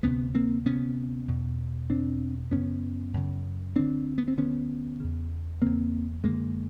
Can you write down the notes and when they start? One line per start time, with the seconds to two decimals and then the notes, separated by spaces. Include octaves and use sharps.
0.03 D2 C3 B3 C#4
0.35 A#3 C4
0.65 D2 C3 B3 C#4
1.27 E2 B2
1.90 E2 B2 C4 D4
2.51 F#2 C#3 B3 C#4
3.14 F#2 C#3
3.76 D2 D3 C4 D4
4.18 B3
4.28 C4
4.37 D2 D3 B3 C#4
5.00 E2 C#3
5.62 E2 C#3 A#3 C4
6.24 F#2 D3 G#3 A#3